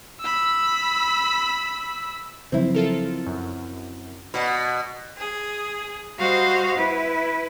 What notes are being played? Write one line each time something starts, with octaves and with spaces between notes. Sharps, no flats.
B5 E6
C#3 F3 F#3 C4 E4
F4 A4 A#4
F#2
B2 D5 F#5 B5
G#4
G3 F#4 C5 D#5 F5 F#5
E4 B4